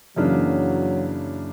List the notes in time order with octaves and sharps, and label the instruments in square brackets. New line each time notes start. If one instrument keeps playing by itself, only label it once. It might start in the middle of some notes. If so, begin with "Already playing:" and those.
[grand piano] F#2 C#3 E3 A#3 D4 [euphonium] F#3